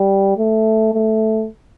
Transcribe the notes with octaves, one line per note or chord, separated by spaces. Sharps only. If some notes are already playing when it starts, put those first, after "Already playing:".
Already playing: G3
A3
A3